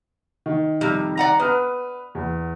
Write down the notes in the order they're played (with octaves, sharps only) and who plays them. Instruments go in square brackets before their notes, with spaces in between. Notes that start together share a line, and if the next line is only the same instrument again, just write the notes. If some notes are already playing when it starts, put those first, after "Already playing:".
[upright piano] D#3
[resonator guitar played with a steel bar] F2 C3 G3
D5 F#5 A#5
[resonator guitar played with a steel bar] B3 [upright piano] B4 F6
[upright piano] E2